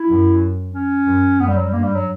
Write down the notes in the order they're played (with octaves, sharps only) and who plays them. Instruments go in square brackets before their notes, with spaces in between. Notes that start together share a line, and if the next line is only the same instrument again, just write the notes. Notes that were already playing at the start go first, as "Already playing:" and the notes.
Already playing: [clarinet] E4
[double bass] F#2
[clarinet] C#4
[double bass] F#2
[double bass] F#2 [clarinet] B3
[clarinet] G3
F#3
G3
[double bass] G2 [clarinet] A#3
[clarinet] G3
F#3